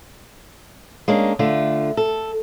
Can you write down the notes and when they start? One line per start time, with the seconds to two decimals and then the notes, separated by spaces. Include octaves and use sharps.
1.08 G#3 A#3 C#4 D4
1.39 D3 A3 F4
1.97 A4